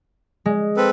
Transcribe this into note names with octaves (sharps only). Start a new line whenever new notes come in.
G#3
C4 A4 B4